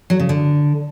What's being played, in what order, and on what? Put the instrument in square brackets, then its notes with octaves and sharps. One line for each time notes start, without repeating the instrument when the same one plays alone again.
[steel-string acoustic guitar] F#3
C#3
D3